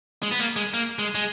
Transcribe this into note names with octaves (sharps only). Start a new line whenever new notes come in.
G#3
B3
A#3
G#3
A#3
G#3
G#3